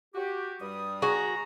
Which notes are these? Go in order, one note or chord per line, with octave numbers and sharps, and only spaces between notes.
F#4 G4
G2 G3 D#6
F#4 G#4 A#5